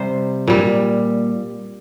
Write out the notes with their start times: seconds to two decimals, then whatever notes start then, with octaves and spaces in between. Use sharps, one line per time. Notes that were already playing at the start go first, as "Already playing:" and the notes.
Already playing: C3 G3 C5
0.47 A#2 G3